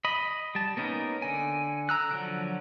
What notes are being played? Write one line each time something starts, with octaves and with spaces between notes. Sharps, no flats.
D#5 B5
G3 A5
A#3 B3 C#4 D#4 A#4
D3 G#5
A#5 E6 F#6
D3 F3 F#3